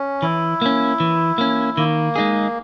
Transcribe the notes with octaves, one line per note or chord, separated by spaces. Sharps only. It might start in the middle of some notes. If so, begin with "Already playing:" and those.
Already playing: C#4
E3 E4
A#3 C#4
E3
A#3 C#4
D#3 A#3
G#3 D#4 G#4